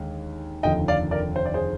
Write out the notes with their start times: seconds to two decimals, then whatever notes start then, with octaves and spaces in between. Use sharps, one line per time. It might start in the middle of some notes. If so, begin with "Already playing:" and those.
Already playing: D#2 D3 G#3
0.63 F1 D#2 D3 F3 D#5 G5
0.88 D5 F5
1.11 A#4 D5
1.36 C5
1.46 D5
1.54 G#4 C5